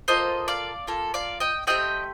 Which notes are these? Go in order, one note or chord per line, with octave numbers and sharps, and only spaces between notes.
A#3 F4 A4 C5 D#5
D5 F5
A#3 F4 A4
D5 F5
D#5 G5
A3 C4 G4 D#5 G5